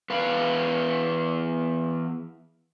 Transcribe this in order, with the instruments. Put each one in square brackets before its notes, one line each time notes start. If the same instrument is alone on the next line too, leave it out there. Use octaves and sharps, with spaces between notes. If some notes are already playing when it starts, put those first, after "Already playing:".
[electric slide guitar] E2 B4 F5